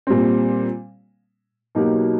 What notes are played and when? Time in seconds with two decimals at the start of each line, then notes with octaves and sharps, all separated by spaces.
0.07 A#2 G3 C4
1.75 B2 F#3 A#3 D#4 G4